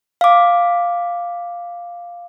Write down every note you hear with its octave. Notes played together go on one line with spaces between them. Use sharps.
F5 D6